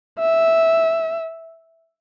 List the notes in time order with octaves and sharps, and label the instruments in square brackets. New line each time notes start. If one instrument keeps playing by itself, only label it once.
[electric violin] E5